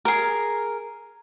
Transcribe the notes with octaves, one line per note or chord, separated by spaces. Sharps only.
G#4 A#4